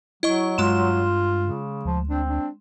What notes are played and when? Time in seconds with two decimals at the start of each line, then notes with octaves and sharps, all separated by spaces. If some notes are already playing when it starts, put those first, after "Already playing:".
0.23 F#3 E4 D#5 C#6
0.58 G2 G#3 F4 C6 E7
1.41 C#3
1.85 D2 F3
2.09 C4 D4
2.29 D4